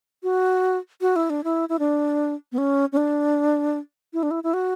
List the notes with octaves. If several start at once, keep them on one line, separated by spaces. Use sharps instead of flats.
F#4
F#4
E4
D4
E4
E4
D4
B3
C#4
C#4
D4
E4
D4
E4
E4
F#4